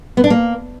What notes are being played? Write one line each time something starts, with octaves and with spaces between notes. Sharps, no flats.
B3
D4
A#3